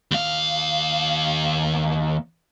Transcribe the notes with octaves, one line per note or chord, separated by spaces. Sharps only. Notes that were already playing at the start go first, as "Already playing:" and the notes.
D#2 F5